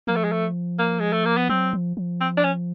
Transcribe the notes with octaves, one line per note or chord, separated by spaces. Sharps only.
F3 A#3
A3
G#3
A3
A#3
G#3
A3
A#3
B3
F#3 C4
F3
F3
C4
D4
C#4